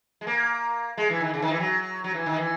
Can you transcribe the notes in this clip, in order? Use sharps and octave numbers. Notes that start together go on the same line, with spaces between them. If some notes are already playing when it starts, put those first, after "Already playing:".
G#3
A#3
G#3
E3
D#3
C#3
D#3
E3
F#3
F#3
E3
D#3
E3